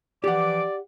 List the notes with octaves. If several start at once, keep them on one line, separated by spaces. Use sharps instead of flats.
E3 F3 G4 D5 F#5 D6